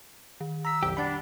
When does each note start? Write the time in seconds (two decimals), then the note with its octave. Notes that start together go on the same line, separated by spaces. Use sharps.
0.41 D#3
0.65 A#5 E6 B6
0.83 B1 F2 G4
0.97 G3 D4 F#5 B5